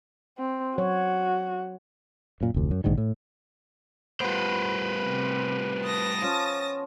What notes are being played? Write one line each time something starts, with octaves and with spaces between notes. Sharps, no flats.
C4
F#3 F#4 C#5
F#2 A#2
F1 D2
F#2
A#1 G#2 D3 D#3
A2
A2 G3 B3 F4 B4 C5
C3
A5 D#6 A#6
F3 C#4